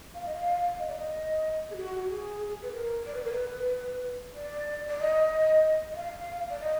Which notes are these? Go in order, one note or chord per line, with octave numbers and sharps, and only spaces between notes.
F5
D#5
F5
D#5
D5
D#5
G#4
F#4
G#4
B4
A#4
D5
B4
A#4
B4
D5
D5
D#5
D#5
F5
D5
D#5